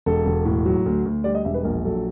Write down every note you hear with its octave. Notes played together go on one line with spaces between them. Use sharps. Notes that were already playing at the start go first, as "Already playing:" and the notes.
E1 A4
E1
A2
F#3
D2
D2
G3 D5
D#5
E1 E5
B4
A#1 A#4
F#3 A4